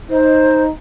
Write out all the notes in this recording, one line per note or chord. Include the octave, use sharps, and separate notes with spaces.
D#4 C5